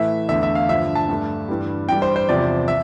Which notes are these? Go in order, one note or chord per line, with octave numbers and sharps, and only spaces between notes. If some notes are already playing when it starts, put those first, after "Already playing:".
Already playing: A2 E3 A3 E5
E2 D3 A3 E5
E5
F5
G2 D3 F3 E5
A5
G2 D3 A3
G2 E3 G3
G2 E3 G3 G5
C5
C5
E2 C3 F3 D5
E5